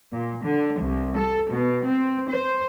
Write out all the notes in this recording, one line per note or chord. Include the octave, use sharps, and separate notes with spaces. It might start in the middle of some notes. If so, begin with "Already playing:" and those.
A#2
D3
C2
A4
B2
C4
C5